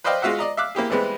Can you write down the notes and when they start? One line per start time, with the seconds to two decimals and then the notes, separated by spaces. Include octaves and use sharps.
0.04 B4 C5 D5 D#5 F5 G5
0.22 G#3 F4 F#4 E5 F#5
0.39 D5 D#5 A#5
0.57 E5 F5 D6 F#6
0.75 A#3 E4 G4 G#4
0.90 E3 G3 G#3 B3 C4